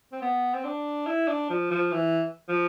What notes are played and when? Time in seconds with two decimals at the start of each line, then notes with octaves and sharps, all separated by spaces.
0.13 C4
0.22 B3
0.54 C4
0.65 D4
1.07 E4
1.28 D4
1.50 F3
1.71 F3
1.92 E3
2.49 F3